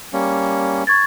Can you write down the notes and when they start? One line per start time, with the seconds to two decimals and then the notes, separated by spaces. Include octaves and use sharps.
0.13 G3 A#3 C#4
0.87 C#6 G#6 A6